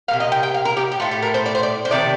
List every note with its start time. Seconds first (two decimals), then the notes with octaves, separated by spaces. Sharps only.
0.08 C3 G3 A#3 F5
0.20 D#5
0.32 G5
0.43 G5
0.54 F5
0.65 A#4
0.77 G4
0.92 G4
1.00 A2 A3 F4
1.11 G4
1.22 A#4
1.34 C5
1.46 D5
1.55 C5
1.63 D5
1.85 C5
1.91 C3 D#3 A3 D5